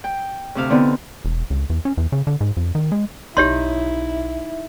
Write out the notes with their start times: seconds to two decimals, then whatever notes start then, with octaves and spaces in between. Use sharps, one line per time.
0.04 G5
0.55 D2 C3 F5
0.69 D3 B3 C4 D#4
1.25 E1
1.50 C#2
1.70 E2
1.85 C#4
1.98 E2
2.12 C#3
2.27 D3
2.41 G#2
2.57 F2
2.75 D#3
2.92 G#3
3.37 B1 C4 D#4 E4 G4 C#5 C6